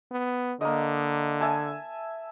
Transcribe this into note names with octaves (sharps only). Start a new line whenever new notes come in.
B3
D3 A#3 D#5
E5 G#5 A5